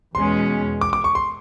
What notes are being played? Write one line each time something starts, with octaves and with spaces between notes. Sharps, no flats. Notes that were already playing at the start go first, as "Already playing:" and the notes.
E2 B2 G#3 C#4 C6
D6
D6
C#6
C6